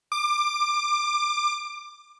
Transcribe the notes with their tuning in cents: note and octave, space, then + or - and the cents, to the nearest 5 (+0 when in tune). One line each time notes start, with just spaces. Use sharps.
D6 +25